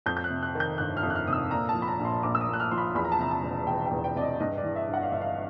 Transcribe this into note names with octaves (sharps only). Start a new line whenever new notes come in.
F2 G6
G6
F#6
C3
F#6
D#3
G6
G1 F#6
F6
F2
F#6
F6
C3 D#6
E6
A#2 A#5
A5
F3
B5
A#5
A#1
C6
A#1 D6
E6
D#6
A#2
F#6
F6
F3 C6
B5
E2 B5
A#5
A5
C3 A#5
A5
E1
E1 G5
G5
E2
G5
C3 D5
D#5
G2 D#5
D5
E3
E5
G1
F#5
F5
G1 E5
F5